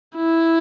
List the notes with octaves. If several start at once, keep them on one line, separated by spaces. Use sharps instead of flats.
E4